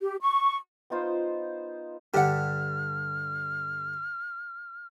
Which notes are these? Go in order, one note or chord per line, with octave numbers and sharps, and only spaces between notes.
G4
C#6
B3 D#4 F4 C5
G2 D3 G4 F#5 F6